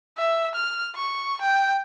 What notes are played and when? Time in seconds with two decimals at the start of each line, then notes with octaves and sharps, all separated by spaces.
0.18 E5
0.55 F6
0.95 C#6
1.41 G5